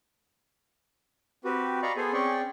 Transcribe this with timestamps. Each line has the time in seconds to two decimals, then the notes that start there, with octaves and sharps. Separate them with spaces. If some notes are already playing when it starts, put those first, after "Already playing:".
1.45 C4 F#4 G4 B4
1.82 D5 D#5 F5 A#5 B5 C#6
1.97 B3 G#4 A4 C5 G#5
2.13 C4 C#4 G#4 D5 G5 C#6